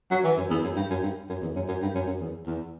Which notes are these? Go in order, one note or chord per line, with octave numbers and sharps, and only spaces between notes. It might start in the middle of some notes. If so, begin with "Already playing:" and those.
F#3
E3
F#2
E2
F#2
G2
F#2
G2
F#2
E2
F#2
F#2
G2
F#2
F#2
E2
E2